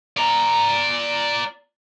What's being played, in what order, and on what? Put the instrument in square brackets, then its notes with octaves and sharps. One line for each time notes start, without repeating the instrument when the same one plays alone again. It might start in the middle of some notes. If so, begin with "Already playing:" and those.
[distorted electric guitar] D5 A#5